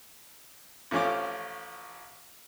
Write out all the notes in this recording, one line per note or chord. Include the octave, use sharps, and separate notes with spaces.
A1 F3 A3 C#4 F4 D6